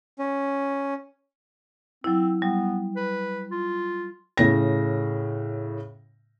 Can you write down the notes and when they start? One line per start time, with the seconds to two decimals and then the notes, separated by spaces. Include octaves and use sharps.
0.19 C#4
2.04 F#3 C4 E4
2.42 G3 B3
2.96 B4
3.52 F4
4.37 A2 C#3 A#6